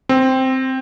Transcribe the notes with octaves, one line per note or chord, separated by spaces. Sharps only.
C4